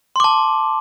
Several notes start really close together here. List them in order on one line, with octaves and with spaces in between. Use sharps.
C6 D6 A5